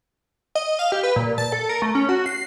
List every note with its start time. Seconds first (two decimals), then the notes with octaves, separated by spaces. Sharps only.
0.55 D#5
0.79 F5
0.92 G4
1.03 B4
1.16 A#2
1.38 A5
1.52 A4
1.69 A#4
1.82 A3
1.95 C#4
2.09 F#4
2.26 C7